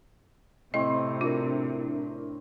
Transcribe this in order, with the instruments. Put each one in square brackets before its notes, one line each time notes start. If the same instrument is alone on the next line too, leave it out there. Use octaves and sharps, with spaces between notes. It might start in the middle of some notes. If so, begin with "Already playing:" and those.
[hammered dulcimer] A2 C4 [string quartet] C3 [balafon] D#5
[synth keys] D4 E4 A#4 [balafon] F4